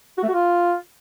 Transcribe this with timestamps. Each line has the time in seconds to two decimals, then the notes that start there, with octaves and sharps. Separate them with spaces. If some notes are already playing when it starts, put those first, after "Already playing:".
0.18 F#4
0.23 A3
0.29 F#4
0.34 F4